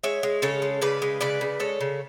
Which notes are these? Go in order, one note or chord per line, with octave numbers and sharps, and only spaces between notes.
G#3 C#5 E5
G#3
C#3 A4 C#5
G#3
C#3 B4 D5
G#3
C#3 B4 D5
C#3
G#3 A4 C#5
C#3